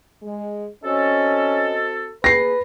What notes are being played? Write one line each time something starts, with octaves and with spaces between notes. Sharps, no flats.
G#3
C4 C#4 F#4 A4 D#5
A#3 G#4 B4 A#6 C7